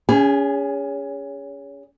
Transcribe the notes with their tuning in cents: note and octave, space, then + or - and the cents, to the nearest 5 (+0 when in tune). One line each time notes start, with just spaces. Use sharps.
C#4 +25 G#4 -25